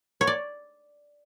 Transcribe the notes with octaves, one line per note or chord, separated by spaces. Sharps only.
C#5
D5